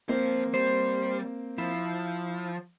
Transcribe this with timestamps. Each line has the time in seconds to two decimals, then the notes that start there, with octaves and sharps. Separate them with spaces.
0.09 F3 A#3 C4 C5
0.54 G3 C5
1.58 F3 E4